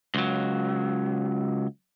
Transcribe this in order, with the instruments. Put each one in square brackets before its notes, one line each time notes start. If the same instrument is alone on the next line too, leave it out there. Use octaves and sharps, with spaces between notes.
[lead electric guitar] C#2 F#3